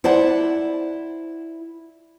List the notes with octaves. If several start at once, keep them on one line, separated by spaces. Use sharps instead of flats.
E4 C5 D5 F#5 A5